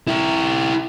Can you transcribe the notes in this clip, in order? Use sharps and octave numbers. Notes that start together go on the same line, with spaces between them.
E4 G4